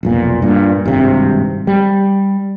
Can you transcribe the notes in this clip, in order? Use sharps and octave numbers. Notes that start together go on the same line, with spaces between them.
F1 B1 A#2
G2 A#2
G#1 G2 C3
G3